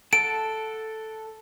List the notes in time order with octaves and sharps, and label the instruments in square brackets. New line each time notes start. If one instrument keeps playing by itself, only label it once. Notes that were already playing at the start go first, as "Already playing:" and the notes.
[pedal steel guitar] A4 F#5 A5 [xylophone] D7